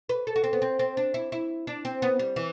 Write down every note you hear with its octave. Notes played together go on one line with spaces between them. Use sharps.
B4
A4
F#4
C4
B3
C4
C4
D4
E4
E4
D4
C4
B3
G3
E3